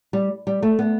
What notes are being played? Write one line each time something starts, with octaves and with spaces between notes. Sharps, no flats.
G3
G3
A3
B3